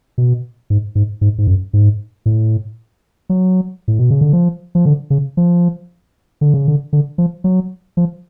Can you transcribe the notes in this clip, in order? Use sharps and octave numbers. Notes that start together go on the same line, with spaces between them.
B2
G#2
G#2
G#2
G#2
F#2
G#2
A2
F#3
A2
B2
C#3
D3
F3
F3
D3
C#3
F3
D3
C#3
D3
D3
F3
F#3
F3